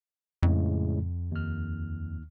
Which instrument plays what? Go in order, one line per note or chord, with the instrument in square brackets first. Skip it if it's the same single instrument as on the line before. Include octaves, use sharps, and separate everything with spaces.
[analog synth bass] F2 [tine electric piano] A2 C#3 G#3
[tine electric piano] D#2 F6